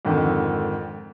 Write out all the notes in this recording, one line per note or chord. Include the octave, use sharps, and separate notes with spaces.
F2 G#2 D3 D#3